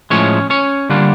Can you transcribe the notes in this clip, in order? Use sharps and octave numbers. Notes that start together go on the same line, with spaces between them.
A2 F3 G#3 C#4 C#5
C#4 C#5
D3 G3 A#3 D4 F4